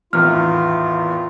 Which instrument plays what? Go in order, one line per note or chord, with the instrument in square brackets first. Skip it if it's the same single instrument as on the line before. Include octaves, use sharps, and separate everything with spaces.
[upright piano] G#1 E2 A2 [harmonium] F4 [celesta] F6